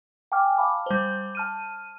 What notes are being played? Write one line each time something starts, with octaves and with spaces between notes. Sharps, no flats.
G5 G#5 D6 F6
F5 A5 B5 D6
G3 C5
A5 F6 D#7